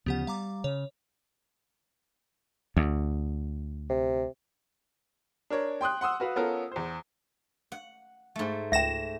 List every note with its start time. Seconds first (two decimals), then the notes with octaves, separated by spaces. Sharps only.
0.06 D2 C#3 F3 B3 G4 F#5
0.27 G3 F5 A#5 D6
0.64 C#3 C#5
2.77 D2
3.90 C3
5.50 D4 A#4 C#5
5.81 G5 C6 D#6 F#6
6.01 F#5 C6 D#6 E6
6.20 F#4 B4 F5
6.36 B3 C#4 F4 A4 A#4
6.72 E2 C5
7.72 F#5
8.36 G#2 A3
8.72 C#2 E5 G5 A#6 E7